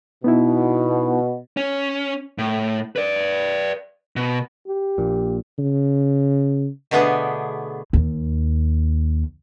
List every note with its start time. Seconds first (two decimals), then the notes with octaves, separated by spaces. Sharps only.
0.24 B2 B3 D#4 E4
1.57 C#4
2.38 A2
2.96 B4 D5
4.16 B2
4.68 G4
4.98 A#1 A#2
5.59 C#3
6.91 B2 D3 A3 B3 D4 G#4
7.93 D#2